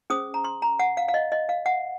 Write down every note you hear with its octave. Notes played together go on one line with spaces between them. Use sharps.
C#4 G#4 C5 D#6
A#5
C6
A#5
F#5
F5
F5
D#5
D#5
F5
F#5